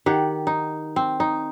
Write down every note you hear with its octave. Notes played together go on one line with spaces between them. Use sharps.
D#3 G4 F#5
D#4
C4
D#4